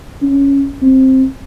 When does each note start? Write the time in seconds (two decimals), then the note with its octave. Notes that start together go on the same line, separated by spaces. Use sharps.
0.22 C#4
0.82 C4